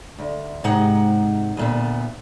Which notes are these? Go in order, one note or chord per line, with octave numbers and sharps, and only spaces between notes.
D2
G#2 C3 G#3 D#4 F#5
D2 A#2 B3